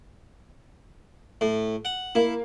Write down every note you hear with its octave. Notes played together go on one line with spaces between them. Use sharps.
A2
F#5
A#3 E4